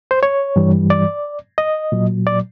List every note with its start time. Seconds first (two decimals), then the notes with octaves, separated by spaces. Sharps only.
0.11 C5
0.23 C#5
0.56 G2 E3 G3
0.90 D5
1.58 D#5
1.92 A#2 F#3
2.27 D5